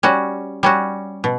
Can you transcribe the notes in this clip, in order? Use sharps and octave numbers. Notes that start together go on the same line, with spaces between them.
G3 C#4 F#4
G3 C#4 F#4
B2